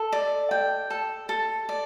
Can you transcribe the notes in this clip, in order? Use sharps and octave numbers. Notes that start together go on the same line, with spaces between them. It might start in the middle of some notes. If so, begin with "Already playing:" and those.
Already playing: A4
D5
G5
A4
A4
D5